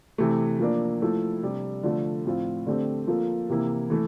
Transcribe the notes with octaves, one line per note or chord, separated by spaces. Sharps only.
C3 E3 A3
F3 A#3 D4
F3 A3 E4 A4
C3 G3 D4
D3 F3 A3
A2 F3 C4 F4
D3 A3 C4 G4
F3 A#3 F4 A4
C3 E3 A#3 E4
E3 A3